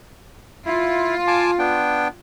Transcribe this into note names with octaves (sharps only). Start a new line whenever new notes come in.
E4 F4
G#5 A5 D6
B3 D4 G5